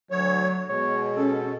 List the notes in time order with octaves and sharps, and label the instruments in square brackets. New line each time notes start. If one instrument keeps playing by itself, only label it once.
[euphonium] D2 [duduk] F#3 [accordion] C#5
[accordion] B2 [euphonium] G#3 [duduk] C#5
[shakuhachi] C#4 [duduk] A4